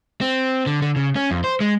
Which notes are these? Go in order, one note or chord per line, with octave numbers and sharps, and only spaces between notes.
C4
D3
D3
C#3
C#4
F2
C5
G#3